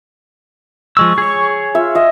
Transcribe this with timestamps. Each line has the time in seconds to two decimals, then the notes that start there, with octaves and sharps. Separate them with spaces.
0.97 F3 G#3 C#6 E6
1.18 G#4 C#5
1.75 F4 E5
1.95 D#5 E5